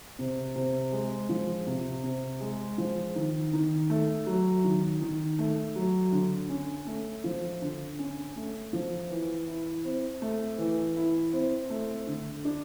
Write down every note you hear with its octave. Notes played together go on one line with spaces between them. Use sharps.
C3
C3
G#3
F3
C3
C3
G#3
F3
D#3
D#3
A3
F#3
D#3
D#3
A3
F#3
D3
C#4
A3
F3
D3
C#4
A3
F3
E3
E4
C4
A3
E3
E4
C4
A3
D3
D4